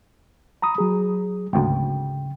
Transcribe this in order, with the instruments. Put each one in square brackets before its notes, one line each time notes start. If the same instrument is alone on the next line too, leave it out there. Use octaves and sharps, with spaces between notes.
[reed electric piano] A#5 B5 D#6
F#3 G#4
[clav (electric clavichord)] G#1 D2 [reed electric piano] C#3 G5